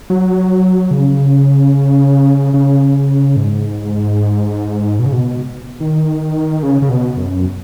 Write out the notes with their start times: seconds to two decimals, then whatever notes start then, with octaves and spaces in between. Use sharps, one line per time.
0.10 F#3
0.91 C#3
2.54 C#3
3.36 G#2
4.99 B2
5.06 C#3
5.13 B2
5.80 D#3
6.63 C#3
6.82 C#3
6.89 B2
7.17 F#2